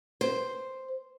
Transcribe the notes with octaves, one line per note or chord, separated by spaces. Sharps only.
C5